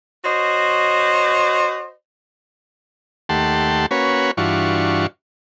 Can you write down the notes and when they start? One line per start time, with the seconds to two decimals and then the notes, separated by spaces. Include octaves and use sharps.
0.25 F#4 C5 C#5 D#5
3.29 D#2 A3 G4 F#5 A5 C6
3.91 A#3 C#4 F#4 B4 C#5
4.37 G2 E3 D4 F4 F#4 C#6